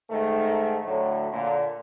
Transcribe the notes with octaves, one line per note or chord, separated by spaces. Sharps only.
G#2 D#3 A3
A2 D3 F#3
A#2 D3